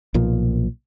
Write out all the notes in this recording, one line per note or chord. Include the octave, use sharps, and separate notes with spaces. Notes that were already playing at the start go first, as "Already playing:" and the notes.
B1 A#2 F3